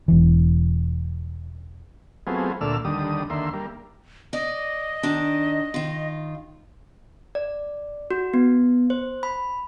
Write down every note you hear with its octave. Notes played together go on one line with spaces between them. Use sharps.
E1 E3
F#3 A3 B3 C4 F4 G#4
D2 A#2 A3 D5 E6 F6
D#2 D3 G3 D#6
D#2 D3 A#3 E5 C6
G3 A#3
D5 D#5
D#3 D4
D#3 F4
D5
F#4
B3
C5
B5